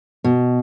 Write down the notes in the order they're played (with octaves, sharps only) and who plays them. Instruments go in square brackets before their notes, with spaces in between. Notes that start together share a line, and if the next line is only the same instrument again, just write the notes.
[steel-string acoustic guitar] B2